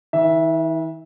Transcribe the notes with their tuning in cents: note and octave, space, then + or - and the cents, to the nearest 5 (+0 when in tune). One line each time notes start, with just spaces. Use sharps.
E3 -45 E5 +0